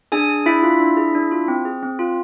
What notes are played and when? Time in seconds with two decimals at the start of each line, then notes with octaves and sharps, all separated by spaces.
0.12 D4 G#4 G#5
0.29 G#4
0.46 D4 E4 E5
0.63 F4
0.80 D4
0.97 G#4
1.15 D4
1.31 F4
1.48 C4
1.65 G#4
1.83 C4
1.99 F4